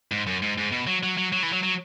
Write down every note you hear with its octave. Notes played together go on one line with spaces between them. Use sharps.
G#2
F#2
G#2
G#2
B2
F#3
F#3
F#3
F#3
E3
F#3
F#3